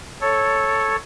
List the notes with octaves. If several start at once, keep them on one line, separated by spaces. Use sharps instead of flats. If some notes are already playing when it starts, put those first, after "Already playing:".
A4 C#5